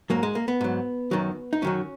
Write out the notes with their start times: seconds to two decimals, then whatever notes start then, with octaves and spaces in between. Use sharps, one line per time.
0.10 G#2 F#3 A#3
0.23 G#3
0.35 A#3
0.48 B3
0.61 G#2 F#3
1.11 F#2 D#3 F#3
1.53 D#4
1.62 F#2 D#3 F#3 C#4